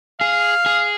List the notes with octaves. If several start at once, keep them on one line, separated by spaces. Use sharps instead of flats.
G#4 F5
G#4